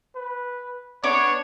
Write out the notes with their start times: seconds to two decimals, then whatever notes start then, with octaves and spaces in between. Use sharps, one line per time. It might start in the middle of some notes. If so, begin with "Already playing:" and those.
0.16 B4
1.04 B3 D4 C#5